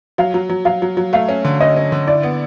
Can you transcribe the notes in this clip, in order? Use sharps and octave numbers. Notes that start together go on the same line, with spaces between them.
F#3 F5
F#3
F#3
F#3 F5
F#3
F#3
A3 F5
C#4
D3
C#4 D#5
C#4
D3
E4 D5
B3